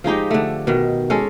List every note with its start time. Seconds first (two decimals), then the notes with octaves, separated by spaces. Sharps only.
0.04 F3 G#3 D#4 G4
0.31 D3 A3
0.67 B2 D#3
1.10 G#3 C#4 A4